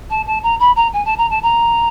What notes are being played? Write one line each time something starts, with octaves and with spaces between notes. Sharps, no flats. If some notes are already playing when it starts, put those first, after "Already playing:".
A5
A5
A#5
B5
A#5
G#5
A5
A#5
A5
A#5